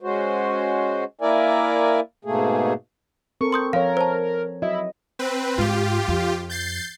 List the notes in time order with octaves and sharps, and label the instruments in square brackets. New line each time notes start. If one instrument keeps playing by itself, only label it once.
[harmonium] G#3 C#4 F#4 C5
A#3 E4 A#4 D5 E5 G#5
G#2 B2 A3 A#3 G#4
[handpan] C4 A4 A#4 [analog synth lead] C#6
[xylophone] C6 D#6 G6
[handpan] F3 C#5 [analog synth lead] A#4 [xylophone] F5
[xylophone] C5 A5
[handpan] F#3 F#4 D#5 [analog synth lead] E4
[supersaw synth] C4 B4
[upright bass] G#2 [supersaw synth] F4 G4
[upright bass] F2
[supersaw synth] G6 A6 C7